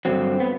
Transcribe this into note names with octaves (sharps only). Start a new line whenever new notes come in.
G2 D3 F#3 C4
B3